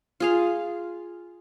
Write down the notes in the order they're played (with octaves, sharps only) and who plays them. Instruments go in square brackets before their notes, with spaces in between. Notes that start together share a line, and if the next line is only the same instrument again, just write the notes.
[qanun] F4 G#4 F5